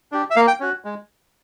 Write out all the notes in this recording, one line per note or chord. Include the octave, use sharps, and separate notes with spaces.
D4 G4
E5
A#3 F5
G5
C#4 F#4
G#3